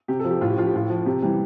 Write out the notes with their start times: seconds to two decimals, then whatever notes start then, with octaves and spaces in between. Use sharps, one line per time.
0.08 C3 G4
0.19 A4
0.24 F3
0.31 G4
0.41 A2 F4
0.50 G4
0.58 F3 F4
0.67 G4
0.74 A2 F4
0.90 F3
1.06 C3 G4
1.22 E3 G3